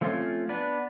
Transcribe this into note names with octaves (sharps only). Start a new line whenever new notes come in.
F3 A3 C4 C#4 F4
B3 D4 B4 D5